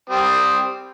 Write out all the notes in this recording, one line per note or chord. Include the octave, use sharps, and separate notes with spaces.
G3 C4 D#6